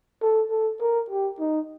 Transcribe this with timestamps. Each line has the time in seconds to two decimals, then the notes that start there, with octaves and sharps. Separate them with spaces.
0.22 A4
0.50 A4
0.80 A#4
1.10 G4
1.39 D#4